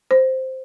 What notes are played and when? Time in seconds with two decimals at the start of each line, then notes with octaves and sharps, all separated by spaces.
0.11 C5